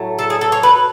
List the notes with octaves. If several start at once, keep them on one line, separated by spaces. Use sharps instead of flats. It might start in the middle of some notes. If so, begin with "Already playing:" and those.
Already playing: A2 F#3 A3
A4
G#4
A4
C#5
B4